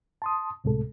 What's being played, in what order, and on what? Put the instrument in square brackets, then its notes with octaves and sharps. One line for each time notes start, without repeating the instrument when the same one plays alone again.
[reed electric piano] A5 C6 D#6
C#2 A2 C3 G#3 A4